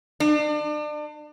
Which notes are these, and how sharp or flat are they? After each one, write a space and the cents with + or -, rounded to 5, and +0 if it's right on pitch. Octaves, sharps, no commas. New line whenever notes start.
D4 +35